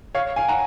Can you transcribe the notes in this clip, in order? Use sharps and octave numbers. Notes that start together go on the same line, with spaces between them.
C#5 F5
F5 G#5
F#5 A#5